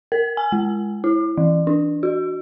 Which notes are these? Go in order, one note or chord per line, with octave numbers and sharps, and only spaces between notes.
A#4
G#5
G#3
E4
E3
D4
F#4